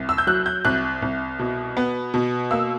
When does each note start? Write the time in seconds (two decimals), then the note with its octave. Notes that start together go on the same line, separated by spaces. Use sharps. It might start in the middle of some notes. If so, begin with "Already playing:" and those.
Already playing: C2
0.09 E6
0.18 G6
0.27 F#3 F#6
0.46 G6
0.65 C2 F#6
1.02 C2
1.39 B2
1.77 B3
2.14 B2
2.51 A#3 E6